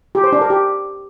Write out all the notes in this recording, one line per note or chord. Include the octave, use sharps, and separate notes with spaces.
G4
C5
D4
A#4
G4